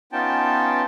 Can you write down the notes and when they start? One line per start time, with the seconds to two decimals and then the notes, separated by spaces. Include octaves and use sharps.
0.12 B3 C#4 D#4 F4 G5 A5